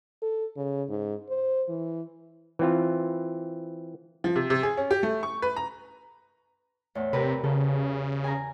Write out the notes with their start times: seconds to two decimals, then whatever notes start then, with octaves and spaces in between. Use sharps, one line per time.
0.22 A4
0.56 C#3
0.89 G#2
1.29 C5
1.68 E3
2.59 E3 C4 F4
4.24 F3
4.36 C3
4.50 C3
4.63 G#4
4.77 C#4
4.91 G4
5.03 A3
5.23 C#6
5.42 B4
5.56 A#5
6.95 E2 A2
7.13 C3 G4 A#4 B4
7.44 C#3 A4
8.24 G#5 A#5